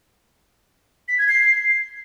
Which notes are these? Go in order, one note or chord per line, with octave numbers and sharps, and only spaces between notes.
B6
G#6
C7